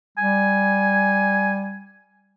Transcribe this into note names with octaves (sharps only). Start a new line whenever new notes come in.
G3 G#5